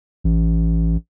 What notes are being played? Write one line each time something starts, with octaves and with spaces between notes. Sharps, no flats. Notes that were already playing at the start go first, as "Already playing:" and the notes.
A1